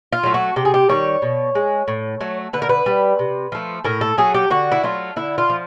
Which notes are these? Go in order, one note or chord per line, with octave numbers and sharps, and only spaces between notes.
F4
F#3 A3
F#4
C3 G4
G#4
G4
D#3 G3 C#5
B2
G#3
A2
F#3 A3
D3 B4
A#4
B4
G3
C3
F3 A3
A2 A#4
A4
F#3 A3 G#4
G4
D3 F#4
E4
F#3 A3 F4
D3 E4
F4
F3